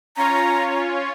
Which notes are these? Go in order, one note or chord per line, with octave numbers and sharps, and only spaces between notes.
C#4 F4 C#5 A#5